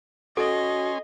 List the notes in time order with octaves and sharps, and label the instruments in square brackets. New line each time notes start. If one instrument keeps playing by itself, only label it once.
[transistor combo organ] C#4 G#5 C6 [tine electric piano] F#4 [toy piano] A4 [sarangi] D#5